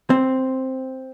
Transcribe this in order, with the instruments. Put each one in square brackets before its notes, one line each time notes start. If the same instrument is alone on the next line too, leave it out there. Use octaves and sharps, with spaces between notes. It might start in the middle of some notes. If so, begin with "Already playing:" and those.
[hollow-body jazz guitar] C4